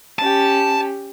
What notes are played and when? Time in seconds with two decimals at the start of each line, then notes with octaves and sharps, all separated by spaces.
0.19 C#4 G4 A5